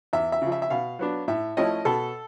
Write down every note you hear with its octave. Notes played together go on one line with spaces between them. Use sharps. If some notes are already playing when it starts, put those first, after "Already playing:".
E2 E5
E5
C#3 F3
E5
E5
B2 F5
F#3 B3 D4
A2 E5
F3 A3 C#4 E4 D#5
B2 A4